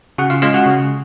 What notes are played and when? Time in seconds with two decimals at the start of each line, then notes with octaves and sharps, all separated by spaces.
0.18 C#3 F#4 F#5
0.30 F4 F5
0.42 G#3 C#4 F4 F5
0.54 F#4 F#5
0.66 C#3